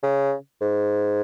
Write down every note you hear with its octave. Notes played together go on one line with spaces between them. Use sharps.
C#3
G#2